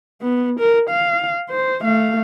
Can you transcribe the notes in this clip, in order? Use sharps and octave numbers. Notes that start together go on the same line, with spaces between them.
B3
A#4
F5
C5
A3 F5